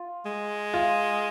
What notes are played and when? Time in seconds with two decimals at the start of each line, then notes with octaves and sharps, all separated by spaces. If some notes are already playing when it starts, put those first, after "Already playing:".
Already playing: F4
0.26 G#3
0.74 F4